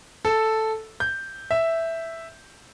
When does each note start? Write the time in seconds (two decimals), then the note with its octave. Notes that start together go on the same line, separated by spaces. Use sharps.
0.25 A4
1.00 G6
1.51 E5